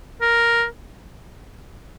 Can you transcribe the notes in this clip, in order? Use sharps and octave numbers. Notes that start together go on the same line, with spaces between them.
A#4